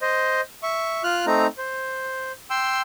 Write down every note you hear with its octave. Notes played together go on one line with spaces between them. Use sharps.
C5 D#5
E5 C#6
F4 F6 F#6
A3 C4 D#4 A#5
C5
G5 C6 E6